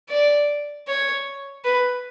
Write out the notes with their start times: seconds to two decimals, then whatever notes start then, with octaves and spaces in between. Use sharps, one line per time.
0.09 D5
0.87 C#5
1.64 B4